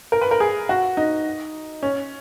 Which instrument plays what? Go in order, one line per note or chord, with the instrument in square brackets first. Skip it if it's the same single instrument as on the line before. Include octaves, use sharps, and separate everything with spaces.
[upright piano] A#4
B4
A#4
G#4
F#4
D#4
C#4